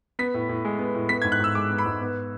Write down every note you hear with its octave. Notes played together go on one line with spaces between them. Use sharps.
B3 B6
A2
A2
G#3
B3
A2
B3 B6
G#6
G#2
F#6
G#2 E6
G#3 D6
B3
B5
G#2
B3